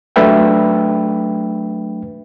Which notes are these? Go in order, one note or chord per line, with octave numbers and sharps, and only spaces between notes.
F#3 A3 D4 B4 E5 G5